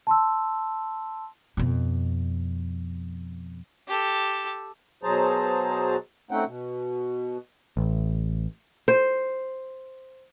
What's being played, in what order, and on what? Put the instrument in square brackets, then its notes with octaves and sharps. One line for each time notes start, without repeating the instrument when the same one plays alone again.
[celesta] A5 C6 E6
[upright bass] F2 B2
[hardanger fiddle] G4 A4
[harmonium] B2 F#3 G#4 C5 A5 A#5
A3 C4 C#4 D#4 F#5 G5
B2
[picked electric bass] A1
[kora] C5